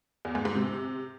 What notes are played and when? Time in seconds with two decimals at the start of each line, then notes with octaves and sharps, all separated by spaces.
0.25 E2
0.35 G#2
0.45 G#2
0.55 C3